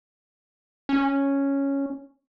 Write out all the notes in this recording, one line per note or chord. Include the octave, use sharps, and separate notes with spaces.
C#4